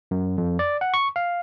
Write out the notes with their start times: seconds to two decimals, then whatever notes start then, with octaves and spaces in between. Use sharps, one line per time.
0.11 F#2
0.38 F2
0.59 D5
0.81 F#5
0.94 C#6
1.16 F5